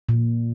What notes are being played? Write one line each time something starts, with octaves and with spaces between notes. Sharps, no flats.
A#2